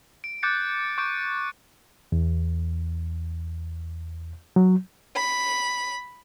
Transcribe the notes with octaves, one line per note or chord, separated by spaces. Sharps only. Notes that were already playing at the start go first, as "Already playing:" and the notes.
D7
D6 F#6 G6 A6 C#7
C#6 D6 G6 D7
E2
F#3
B5